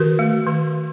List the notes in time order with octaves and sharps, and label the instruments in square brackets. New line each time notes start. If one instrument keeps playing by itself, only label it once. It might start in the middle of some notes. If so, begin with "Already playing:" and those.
Already playing: [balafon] D#3 F#4 A#4
A3
D#3